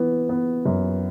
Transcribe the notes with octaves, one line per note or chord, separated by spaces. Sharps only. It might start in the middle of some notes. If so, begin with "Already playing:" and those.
Already playing: E3 B3
B3
F#2